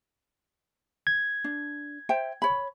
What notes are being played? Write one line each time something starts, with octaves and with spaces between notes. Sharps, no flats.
G#6
D4
C5 E5 G5
C#5 B5